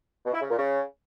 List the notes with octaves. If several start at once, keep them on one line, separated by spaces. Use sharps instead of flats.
B2
E4
C#3
A#2
C#3